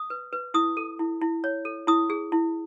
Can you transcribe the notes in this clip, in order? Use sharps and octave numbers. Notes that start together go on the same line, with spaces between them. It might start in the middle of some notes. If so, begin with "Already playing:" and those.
Already playing: D#6
B4
B4
E4 D#6
A4
E4
E4
C#5
A4
E4 D#6
G#4
E4